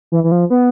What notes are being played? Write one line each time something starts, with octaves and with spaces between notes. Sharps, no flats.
E3
E3
F3
B3